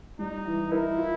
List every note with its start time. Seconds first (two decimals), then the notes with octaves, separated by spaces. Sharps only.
0.19 G3 D#4
0.45 E3
0.72 E4 A#4
0.97 F4